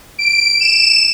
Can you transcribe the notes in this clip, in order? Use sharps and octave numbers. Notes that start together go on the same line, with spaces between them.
D7
E7